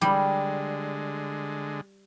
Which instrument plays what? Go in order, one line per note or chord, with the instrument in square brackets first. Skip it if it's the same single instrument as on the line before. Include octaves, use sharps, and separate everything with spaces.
[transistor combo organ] D3 G#3 [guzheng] G3